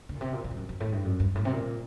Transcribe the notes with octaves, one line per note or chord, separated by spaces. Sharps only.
D3
A#2
C3
A#2
A2
G2
F#2
F#2
A2
G2
F#2
G2
A2
C3
A#2